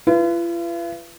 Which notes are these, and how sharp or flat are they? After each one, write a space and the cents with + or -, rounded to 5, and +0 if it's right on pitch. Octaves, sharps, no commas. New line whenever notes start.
F4 -45 B4 +0